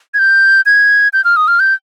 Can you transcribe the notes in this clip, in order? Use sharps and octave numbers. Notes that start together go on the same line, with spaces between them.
G#6
G6
G#6
G6
F6
D#6
F6
G6